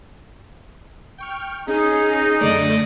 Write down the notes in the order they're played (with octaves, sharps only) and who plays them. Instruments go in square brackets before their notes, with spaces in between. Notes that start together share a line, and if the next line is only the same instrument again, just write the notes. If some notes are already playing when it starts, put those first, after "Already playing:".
[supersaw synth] G5 C#6 F6
[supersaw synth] C#4 [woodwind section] D#4 [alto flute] G#4
[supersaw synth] F#2 D3 A3 [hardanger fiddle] D5 D#5